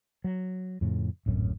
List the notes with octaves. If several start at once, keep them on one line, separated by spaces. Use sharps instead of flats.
F#3
F2 A2 C#3
D1 G#1 F#2 A2